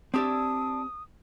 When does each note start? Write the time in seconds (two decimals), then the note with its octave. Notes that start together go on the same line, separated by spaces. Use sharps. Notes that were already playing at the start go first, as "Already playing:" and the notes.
0.14 C4 D4 E4 G4 D5 D#6 E6